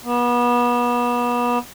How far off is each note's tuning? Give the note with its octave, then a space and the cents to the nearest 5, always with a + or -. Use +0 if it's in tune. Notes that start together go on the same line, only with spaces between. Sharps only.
B3 -30